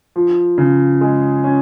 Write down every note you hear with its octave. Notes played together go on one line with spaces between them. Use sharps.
F3
C#3
G#3
C#4